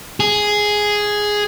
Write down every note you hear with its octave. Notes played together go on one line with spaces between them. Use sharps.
G#4